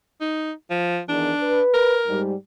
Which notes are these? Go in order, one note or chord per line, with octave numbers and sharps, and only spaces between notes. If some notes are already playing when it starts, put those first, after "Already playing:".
D#4
F3
E2 D#3 D4
B4
A#4
G#2 G3